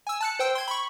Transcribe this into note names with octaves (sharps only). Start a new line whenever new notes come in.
G#5 E6
A5 F#6 C#7
C5 G5 E6
C6 G#6
B5 C#6